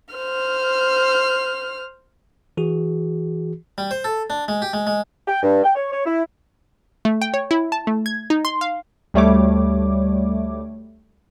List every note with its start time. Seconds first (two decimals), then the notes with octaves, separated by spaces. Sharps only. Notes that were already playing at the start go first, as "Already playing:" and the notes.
0.15 C5 F6
2.57 E3 F#4 G#4
3.78 G3
3.91 C5
4.04 A4
4.30 D4
4.48 G#3
4.62 G4
4.73 G#3
4.87 G#3
5.27 G5
5.43 G2
5.64 G5
5.75 C#5
5.92 C#5
6.05 E4
7.05 A3
7.22 G5
7.34 C#5
7.51 E4
7.72 A5
7.87 A3
8.06 G#6
8.30 D#4
8.45 C6
8.61 F5
9.14 D2 G3 A3 C#5 D6